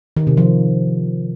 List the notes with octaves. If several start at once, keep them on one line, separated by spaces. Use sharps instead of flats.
D#3
C3
F3